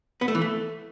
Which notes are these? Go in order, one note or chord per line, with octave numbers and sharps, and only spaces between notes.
B3
A3
E3
A3